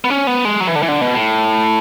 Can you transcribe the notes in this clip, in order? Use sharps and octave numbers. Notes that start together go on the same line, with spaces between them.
B3
C#4
B3
G#3
F#3
E3
D3
E3
D3
B2
A2